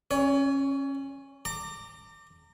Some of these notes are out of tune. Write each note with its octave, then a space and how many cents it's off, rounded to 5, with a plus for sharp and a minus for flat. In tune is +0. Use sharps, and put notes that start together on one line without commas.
C#4 -15 C#5 +30
A#5 -40 D6 +0